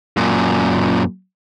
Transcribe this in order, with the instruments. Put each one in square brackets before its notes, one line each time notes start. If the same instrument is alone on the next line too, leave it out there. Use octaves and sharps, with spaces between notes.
[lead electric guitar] F#2 A#2